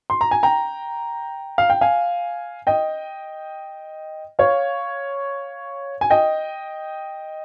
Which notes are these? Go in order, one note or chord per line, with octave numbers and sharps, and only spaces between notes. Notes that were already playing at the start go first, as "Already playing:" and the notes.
C6
A#5
G#5
G5 A#5
F5
G5
F5 G#5
D#5 G5
C#5 F5
G#5
D#5 G5